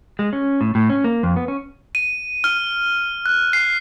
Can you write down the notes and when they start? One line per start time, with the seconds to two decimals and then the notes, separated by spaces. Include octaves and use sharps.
0.19 G#3
0.33 C#4
0.61 A2
0.75 A2
0.89 C#4
1.04 A#3
1.23 F2
1.36 B3
1.48 C#4
1.95 D#7
2.44 F6
3.26 F#6
3.53 C7